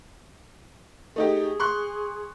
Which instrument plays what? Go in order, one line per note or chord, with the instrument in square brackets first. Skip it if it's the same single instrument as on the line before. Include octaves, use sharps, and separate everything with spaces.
[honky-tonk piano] A3 D#4 G4 [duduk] G#4
[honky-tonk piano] C6 C#6 F#6